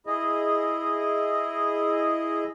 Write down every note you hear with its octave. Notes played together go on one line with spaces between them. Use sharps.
E4 G#4 D#5